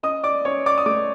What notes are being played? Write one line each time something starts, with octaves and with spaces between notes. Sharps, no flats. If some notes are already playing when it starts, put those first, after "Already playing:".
C#4 D#5 D#6
D5 D6
C#4 C#5 C#6
D5 D6
D#6
A3 D5 D6